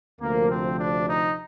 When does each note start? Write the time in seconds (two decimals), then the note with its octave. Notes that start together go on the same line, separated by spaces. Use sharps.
0.20 D2 C3 F3 A#3
0.50 C4
0.78 D4
1.08 D#4